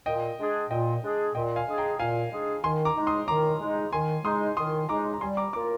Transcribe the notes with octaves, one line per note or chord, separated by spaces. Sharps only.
A#2 D#5 G5
G#3 D4 G#4
A#2 D#5 G5
G#3 D4 G#4
A#2 D#5 G5
F5 G#5
G#3 D4 G#4
G5 A#5
A#2 F5 G#5
G#3 D4 G#4
D#3 G#5 C6
A#5 D6
G#3 D#4
C6 D#6
D#3 A#5 D6
G#3 D#4
D#3 G#5 C6
G#3 D#4 C6 D#6
D#3 C6 D#6
G#3 D#4 A#5 D6
A#5
G3 G#5 C6
A#5 D6
A#3 F4 A#4 A#5 D6